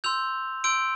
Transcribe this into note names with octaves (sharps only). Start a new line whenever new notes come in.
C6 E6 G6 F7
C6 E6 G6 D7